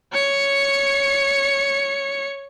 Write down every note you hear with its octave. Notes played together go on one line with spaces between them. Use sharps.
C#5 C#7